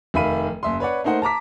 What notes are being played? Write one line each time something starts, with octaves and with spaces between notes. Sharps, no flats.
F1 D#3 E5 F5 B5 D#7
F#1 E5 C6
B4 C#5 D5 F#5
A3 A#3 D#4 C5 F#5
A5 A#5 D6 B6